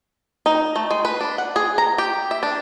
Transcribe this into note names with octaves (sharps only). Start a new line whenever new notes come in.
D#4
A3
G#3
B4
D4
F#5
G#4
A#5
G4
E5
D4